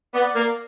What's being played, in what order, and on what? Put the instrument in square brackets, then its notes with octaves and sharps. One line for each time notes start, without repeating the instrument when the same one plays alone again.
[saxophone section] B3 [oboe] D5
[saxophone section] A#3